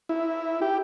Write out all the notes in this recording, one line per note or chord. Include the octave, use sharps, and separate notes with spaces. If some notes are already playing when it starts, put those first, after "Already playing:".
E4
G4